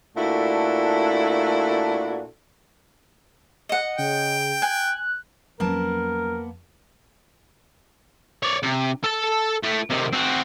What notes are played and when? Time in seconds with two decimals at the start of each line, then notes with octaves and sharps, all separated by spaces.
0.17 A#2 A3 D4 E4 F#4 A4
3.69 D#5 F#5
3.98 C#3 G5
4.62 G#5 F#6
5.60 F2 F#3 A#3 B3 C#4 A#4 A5
8.43 C#5 D5
8.63 C3
9.04 A4 A5
9.63 A3 E4
9.90 C3 D#3
10.13 C4 F#4